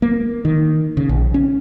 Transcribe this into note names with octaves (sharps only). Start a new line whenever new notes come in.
A#3
D#3
C#3
A#1
C#4